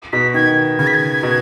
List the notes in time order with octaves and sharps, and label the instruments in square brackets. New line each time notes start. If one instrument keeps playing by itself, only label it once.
[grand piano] B2 [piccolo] B6
[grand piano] D#3 [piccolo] G#6
[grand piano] C#3 [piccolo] G#6
[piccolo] B6
G#6
[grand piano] B2